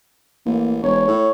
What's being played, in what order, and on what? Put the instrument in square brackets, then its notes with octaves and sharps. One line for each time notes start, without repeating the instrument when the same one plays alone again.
[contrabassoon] A1 [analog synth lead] A#3
[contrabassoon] E1 [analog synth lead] C#5
[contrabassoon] A2